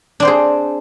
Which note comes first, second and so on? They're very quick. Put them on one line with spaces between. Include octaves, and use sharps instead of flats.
D4 C4 C5 G#4